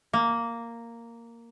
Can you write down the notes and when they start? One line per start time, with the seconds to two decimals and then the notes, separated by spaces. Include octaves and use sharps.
0.13 A#3